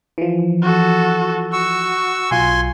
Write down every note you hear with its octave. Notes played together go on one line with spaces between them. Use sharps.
E3 F3
F#4 A4
F#4 C#6 E6
B1 F4 G#5 C6